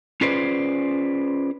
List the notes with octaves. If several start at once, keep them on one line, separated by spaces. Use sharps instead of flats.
C#4 F4 G#4 B4 C5 D5